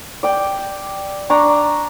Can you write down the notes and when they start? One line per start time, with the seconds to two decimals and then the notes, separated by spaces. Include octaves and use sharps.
0.23 D5 G5
1.30 D4 D5 A#5 C#6